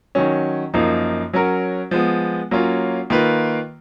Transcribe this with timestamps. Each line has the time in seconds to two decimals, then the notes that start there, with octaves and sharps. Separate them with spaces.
0.15 D#3 F#3 C#4
0.74 F#2 F3 A#3 D#4
1.33 F#3 C#4 F#4 A#4
1.91 F3 G#3 B3
2.51 F#3 A#3 C#4 F4
3.10 D#3 A#3 F4 B4